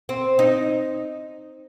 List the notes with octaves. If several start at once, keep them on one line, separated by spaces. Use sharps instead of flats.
C4
D#4